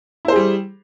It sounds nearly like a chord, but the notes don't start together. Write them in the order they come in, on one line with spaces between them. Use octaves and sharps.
E4 C5 G#4 G3